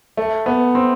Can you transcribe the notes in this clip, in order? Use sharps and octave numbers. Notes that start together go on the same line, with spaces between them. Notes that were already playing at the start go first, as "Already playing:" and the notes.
A3
B3
C4